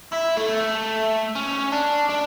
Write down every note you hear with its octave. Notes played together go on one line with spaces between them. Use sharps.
E4
A3
C#4
D4
D4